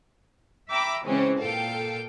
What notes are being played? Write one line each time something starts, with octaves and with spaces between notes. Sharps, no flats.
E5 G5 A#5 B5 D6 E6
C#3 E3 G#3 C4 C#4
A#2 A4 F5 G5